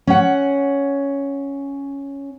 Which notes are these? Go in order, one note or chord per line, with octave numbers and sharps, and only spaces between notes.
C#4 F#5